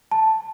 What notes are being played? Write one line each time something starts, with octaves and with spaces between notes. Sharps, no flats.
A5